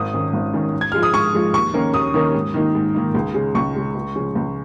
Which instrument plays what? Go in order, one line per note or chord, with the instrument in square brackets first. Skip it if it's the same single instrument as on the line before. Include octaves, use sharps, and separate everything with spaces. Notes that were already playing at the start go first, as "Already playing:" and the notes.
Already playing: [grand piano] G#1 [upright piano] D#6
[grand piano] G#2 D#3 C#4
G#1
G#2 D#3 C#4
G#2
[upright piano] G#6
[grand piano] F3 G#3 F4 G#4 [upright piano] F6
[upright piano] D#6
[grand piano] G#2 [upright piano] C#6
[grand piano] F3 G#3 F4 G#4
[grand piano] D#2 [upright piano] C#6
[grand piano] D#3 A#3 C#4 A#4
[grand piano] D#2 [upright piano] D#6
[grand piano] D#3 A#3 C#4 A#4
G#2
D#3 A#3 D#4
G#2
D#3 A#3 D#4
C#2
C#3 G#3
[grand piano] C#2 [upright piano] C#6
[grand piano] C#3 G#3
C#2
C#3 F3
C#2